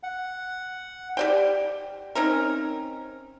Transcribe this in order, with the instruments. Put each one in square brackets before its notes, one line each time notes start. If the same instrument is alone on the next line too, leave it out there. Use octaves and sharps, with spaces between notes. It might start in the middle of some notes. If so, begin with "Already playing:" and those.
[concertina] F#5
[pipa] G4 D5 G5
C4 C#4 D#4 A#4